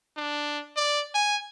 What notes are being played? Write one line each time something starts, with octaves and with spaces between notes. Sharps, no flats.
D4
D5
G#5